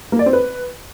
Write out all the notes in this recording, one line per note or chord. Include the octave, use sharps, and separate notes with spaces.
A#3
D5
C4
B4